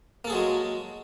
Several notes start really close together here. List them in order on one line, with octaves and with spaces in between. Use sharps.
A#3 A4 G#4 F#3 G#3